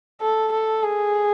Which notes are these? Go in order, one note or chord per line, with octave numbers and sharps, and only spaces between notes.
A4
A4
G#4